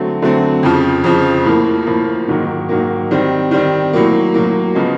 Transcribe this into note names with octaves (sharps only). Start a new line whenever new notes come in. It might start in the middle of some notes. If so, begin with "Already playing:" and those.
Already playing: D3 F#3 A3 C4
D3 F#3 A3 C4
F2 C#3 F3
F2 C#3 F3
A2 F3 A#3
A2 F3 A#3
G#2 D#3 F#3 A#3
G#2 D#3 F#3 A#3
D#3 G3 C4
D#3 G3 C4
A2 F#3 A#3
A2 F#3 A#3
C#3 F3 G#3 B3